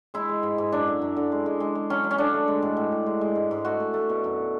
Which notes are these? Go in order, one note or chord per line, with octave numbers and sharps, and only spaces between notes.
G#3 E4
G#3
G#2
G#2
F#2 D4
D3
F#2
D3
G#3
G#3
G#3
G#3
F#3 C#4
F#3
C#4
D3 D4
A3
G#3
A2
A2
A2
G#3
G#3
G#2
G#2
A3 F#4
A3
A3
B2
F#2